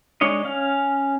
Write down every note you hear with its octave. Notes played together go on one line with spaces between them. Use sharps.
G#3 D4 C#5 D#5
C#4 F5